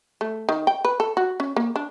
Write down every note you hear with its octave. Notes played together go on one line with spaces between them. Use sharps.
A3
D#3
G5
B4
A4
F#4
C#4
A#3
D4